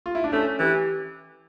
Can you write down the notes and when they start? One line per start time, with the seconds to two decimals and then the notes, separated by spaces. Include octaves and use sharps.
0.06 F4
0.15 E4
0.24 D4
0.32 A3 C#4
0.59 E3 G4